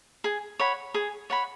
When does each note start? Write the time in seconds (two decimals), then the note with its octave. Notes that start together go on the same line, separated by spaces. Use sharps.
0.24 G#4
0.59 C#5 F#5 B5
0.94 G#4
1.30 C#5 F#5 B5